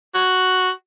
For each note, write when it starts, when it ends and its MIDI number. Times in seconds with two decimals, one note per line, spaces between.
0.15 0.70 66